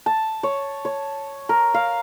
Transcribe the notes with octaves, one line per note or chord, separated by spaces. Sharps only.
A5
C#5
C#5
A#4
F5